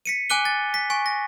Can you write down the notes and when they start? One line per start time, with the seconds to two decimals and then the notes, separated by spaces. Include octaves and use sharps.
0.06 B6 C#7 D#7
0.30 G#5 D6 F#6 D#7 G7
0.45 A6
0.74 B6
0.90 G#5 C#6
1.06 A#6